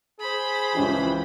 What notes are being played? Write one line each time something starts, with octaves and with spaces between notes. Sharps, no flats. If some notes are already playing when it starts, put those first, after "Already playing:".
G#4 C5 B5
C#2 E3 F3 C#4 G4